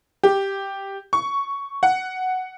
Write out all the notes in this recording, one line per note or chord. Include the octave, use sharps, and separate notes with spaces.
G4
C#6
F#5